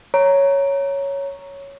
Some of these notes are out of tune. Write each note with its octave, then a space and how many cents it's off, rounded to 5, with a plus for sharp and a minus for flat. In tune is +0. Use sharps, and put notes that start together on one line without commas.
C#5 +0 A#5 +0